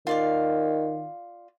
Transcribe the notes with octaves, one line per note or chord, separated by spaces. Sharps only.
D#3 F4 D5 F5